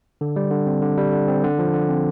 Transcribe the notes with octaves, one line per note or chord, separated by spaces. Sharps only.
D3
G3
D3
C4
D3
G3
D3
C4
D3
F3
D3
C4